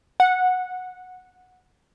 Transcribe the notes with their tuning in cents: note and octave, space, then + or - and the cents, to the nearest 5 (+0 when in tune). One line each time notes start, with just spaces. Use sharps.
F#5 -10